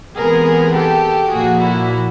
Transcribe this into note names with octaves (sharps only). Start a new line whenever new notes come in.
C3 E3 G#3 B3 G#4 A#4
G4 A4
A#2 F3 A#3 F#4 G#4
E4 F#4